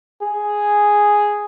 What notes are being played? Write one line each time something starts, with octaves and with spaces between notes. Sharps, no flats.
G#4